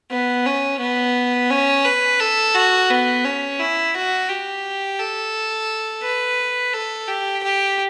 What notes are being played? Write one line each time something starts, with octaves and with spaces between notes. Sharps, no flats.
B3
C#4
B3
C#4
B4
A4
F#4
B3
C#4
E4
F#4
G4
A4
B4
A4
G4
G4